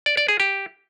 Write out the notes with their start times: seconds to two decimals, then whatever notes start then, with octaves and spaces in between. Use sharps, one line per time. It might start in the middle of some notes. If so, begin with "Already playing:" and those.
0.06 D5
0.17 D5
0.28 G#4
0.40 G4